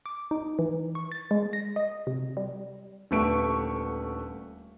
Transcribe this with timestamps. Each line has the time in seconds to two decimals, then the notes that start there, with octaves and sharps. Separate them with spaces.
0.06 D6
0.31 D#4
0.59 E3
0.95 C#6
1.12 A6
1.31 G#3
1.53 A#6
1.76 D#5
2.07 C3
2.37 G3
3.11 D#1 D3 A3 B4 C#6 D7